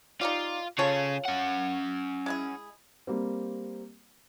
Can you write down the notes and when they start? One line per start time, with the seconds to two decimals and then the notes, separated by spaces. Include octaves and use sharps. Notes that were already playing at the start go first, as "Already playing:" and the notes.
0.21 D#4 F4 G4 D5
0.79 C#3 F4 G#4 A4 C#5
1.25 C#4 F#5
2.26 G#3 E4 G#4
3.07 G3 A#3 C4